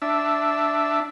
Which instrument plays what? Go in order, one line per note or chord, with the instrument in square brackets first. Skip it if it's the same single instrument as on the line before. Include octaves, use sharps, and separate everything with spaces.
[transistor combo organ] D4 E5